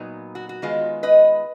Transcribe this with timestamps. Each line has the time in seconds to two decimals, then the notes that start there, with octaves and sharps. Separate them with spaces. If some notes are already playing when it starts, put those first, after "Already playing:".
Already playing: A#2 F#3 B3 D#4
0.35 F#4
0.49 F#4
0.62 D#3 G#3 B3 F4
1.03 B4 D#5